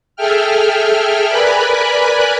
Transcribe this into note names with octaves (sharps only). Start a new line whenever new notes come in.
G#4 A4 E5 G5 F6
A#4 B4 D5 G#5 B5 F#6